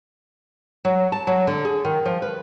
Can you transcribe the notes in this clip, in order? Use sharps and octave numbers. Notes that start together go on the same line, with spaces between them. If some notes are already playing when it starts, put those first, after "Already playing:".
F#3
A5
F#3
D3
G#4
D#3
F3
B4